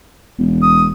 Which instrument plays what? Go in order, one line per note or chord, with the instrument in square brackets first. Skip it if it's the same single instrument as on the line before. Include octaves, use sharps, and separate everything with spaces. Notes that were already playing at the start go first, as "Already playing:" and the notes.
[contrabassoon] E1
[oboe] D#6